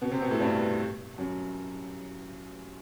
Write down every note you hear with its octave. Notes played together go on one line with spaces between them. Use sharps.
B2 B3
C3 C4
B2 B3
A2 A3
G2 G3
F#2 F#3